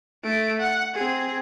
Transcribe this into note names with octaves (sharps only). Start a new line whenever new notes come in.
A3 D7
F#5
C4 G#4